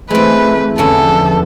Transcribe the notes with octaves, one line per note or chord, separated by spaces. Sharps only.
E3 G#3 A3 C4 B4
E2 D3 E3 F3 C#4 E4 A4